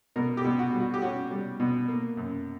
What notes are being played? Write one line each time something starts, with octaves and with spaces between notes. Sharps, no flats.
B2 A#4
G4
B2
F#4
G3
F#4
G4
C#4 F#4
G3
B2
A#3
F#2